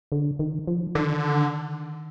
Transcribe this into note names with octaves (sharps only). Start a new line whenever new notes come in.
D3
D#3
F3
D3 D#3